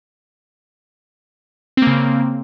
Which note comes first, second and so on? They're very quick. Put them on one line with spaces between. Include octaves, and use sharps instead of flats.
C4 A#3 C#3